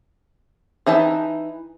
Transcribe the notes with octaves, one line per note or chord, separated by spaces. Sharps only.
E3 D#4 E5 A5